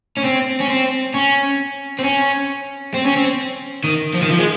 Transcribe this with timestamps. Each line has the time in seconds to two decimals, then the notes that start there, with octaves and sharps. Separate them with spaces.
0.17 C#4
0.24 C4
0.60 C#4
0.69 C4
1.14 C#4
1.99 C4
2.04 C#4
2.94 C4
3.05 C#4
3.16 C4
3.84 D#3
4.14 F3
4.22 D#3
4.31 F3
4.39 G#3